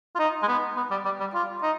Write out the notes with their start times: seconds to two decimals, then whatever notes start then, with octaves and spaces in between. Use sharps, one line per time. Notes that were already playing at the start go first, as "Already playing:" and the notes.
0.15 F4
0.19 D#4
0.42 G#3
0.48 B3
0.76 B3
0.91 G3
1.05 G3
1.20 G3
1.34 F4
1.62 D#4